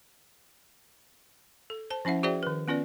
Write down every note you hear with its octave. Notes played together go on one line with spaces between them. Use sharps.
A4
C5 A5
F3 C#4 E4 E5 F#5
F#4 G#4 C5 D5 E5 G5
D#3 B4
B3 C#4 F4 B4 D5